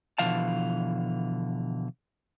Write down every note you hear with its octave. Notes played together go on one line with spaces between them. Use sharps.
B2 D3 E3 F3 F5 A5